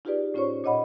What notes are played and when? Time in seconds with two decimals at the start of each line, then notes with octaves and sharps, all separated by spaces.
0.05 D#4 F4 G4 G#4 B4 D5
0.34 A2 C#4 F4 C5 C#5 C#6
0.64 A#2 C#5 D#5 F#5 B5